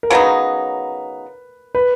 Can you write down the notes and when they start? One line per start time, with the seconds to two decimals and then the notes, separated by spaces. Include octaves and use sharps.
0.03 A#4
0.10 C#3 F#3 B3 D#4 B4
1.75 B4